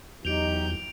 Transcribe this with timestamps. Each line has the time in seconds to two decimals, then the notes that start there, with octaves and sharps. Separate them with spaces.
0.25 E2 E3 F#3 D#4 G4 G6 D7 F7